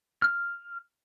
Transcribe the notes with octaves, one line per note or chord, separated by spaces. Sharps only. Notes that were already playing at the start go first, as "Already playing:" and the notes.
F6